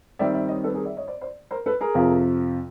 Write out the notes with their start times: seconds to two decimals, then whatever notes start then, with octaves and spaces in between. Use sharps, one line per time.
0.19 D#3 G3 C4 D5 E5
0.34 D5 E5
0.48 C#5 D#5
0.63 A4 B4
0.74 G#4 A#4
0.85 D5 E5
0.97 C#5 D#5
1.07 C5 D5
1.21 C5 D5
1.51 A#4 C5
1.66 A4 B4
1.81 G#4 A#4
1.94 F2 C3 F3